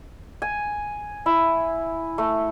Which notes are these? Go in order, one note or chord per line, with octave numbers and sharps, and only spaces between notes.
G#5
E4
A3